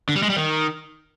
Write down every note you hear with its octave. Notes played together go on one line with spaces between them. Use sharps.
D3
G3
G#3
G3
D#3